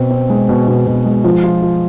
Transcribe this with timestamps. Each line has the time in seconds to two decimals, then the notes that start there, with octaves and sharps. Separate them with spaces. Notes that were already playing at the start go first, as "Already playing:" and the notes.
Already playing: B2 C4
0.11 C4
0.30 G#3
0.49 B2
0.68 B2
0.87 B2
1.05 G#3
1.24 F3
1.44 F4
1.62 F4